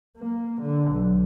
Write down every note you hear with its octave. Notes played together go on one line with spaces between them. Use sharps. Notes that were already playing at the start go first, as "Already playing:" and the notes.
A#3
D3
B1